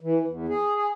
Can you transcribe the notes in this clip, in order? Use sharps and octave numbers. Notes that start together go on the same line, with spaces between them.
E3
E2
G#4
G#4